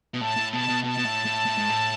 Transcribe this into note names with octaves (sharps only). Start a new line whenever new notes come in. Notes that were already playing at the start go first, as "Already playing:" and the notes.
B2
A2 A5
A2
B2 A5
B2
B2 A5
B2
A2
A2
A2
G#2
A2